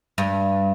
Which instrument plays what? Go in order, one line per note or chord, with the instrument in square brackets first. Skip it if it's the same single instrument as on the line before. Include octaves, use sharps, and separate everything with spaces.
[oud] G2